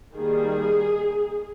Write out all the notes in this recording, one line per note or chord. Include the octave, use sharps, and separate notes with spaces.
D#3 G3 A#3 G#4